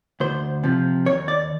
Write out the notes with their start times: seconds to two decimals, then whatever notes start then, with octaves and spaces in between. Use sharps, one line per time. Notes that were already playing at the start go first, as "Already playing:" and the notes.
0.20 D2 C5
0.64 C3 F3
1.06 D#2 C#5
1.28 D5